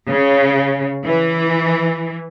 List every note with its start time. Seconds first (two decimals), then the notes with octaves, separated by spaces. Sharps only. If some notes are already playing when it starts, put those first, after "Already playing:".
0.10 C#3
1.05 E3